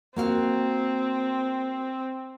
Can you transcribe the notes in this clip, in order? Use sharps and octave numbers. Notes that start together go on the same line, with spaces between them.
A#3 C4 F#4 F5